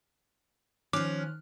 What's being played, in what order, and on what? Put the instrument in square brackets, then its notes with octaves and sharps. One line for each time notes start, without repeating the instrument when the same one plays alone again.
[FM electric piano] D#3 F6 F#6 [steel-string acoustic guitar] F3 C#4 [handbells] D6